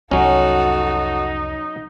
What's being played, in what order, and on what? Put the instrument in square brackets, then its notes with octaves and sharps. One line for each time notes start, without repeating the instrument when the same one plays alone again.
[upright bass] C2 F2 [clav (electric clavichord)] F#3 C#4 [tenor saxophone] D#4 [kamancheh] F#4 A4